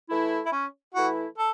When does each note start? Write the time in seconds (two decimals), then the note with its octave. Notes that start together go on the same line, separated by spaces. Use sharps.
0.10 E3 A3 E4
0.46 E4
0.52 C#4
0.94 E3 A3 E4 F#4
1.38 A4